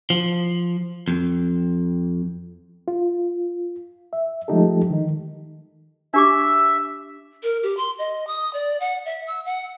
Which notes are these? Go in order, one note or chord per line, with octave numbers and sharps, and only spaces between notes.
F3
F2
F4
E5
F3 G#3 A3 D#4 G4 A4
D#3 D#4
D4 G4 E5 D6
A#4
G4
C6
D#5
D#6
D5
F#5
E5
E6
F#5